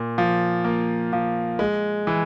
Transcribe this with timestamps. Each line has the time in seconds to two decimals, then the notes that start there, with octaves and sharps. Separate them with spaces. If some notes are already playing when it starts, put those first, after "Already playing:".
Already playing: A#2
0.18 F3
0.65 A#3
1.13 F3
1.59 G#3
2.07 E3